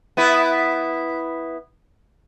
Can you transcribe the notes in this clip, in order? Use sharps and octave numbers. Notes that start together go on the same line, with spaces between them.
B3 E4 B4